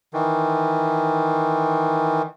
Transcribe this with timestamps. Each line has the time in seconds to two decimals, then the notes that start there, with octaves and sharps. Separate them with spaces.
0.14 D#3 E3